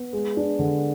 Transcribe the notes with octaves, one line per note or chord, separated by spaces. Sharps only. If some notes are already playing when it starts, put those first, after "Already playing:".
Already playing: B3
G#3
D4
D3